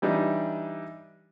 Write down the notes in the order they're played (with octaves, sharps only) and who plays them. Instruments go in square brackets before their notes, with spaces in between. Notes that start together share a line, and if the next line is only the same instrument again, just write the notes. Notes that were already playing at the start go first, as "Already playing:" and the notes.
[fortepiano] E3 G3 D4 D#4